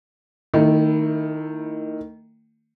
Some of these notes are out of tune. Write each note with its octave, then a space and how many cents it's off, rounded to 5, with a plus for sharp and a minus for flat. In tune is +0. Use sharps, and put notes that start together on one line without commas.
D#3 +0 A3 +45 E4 +0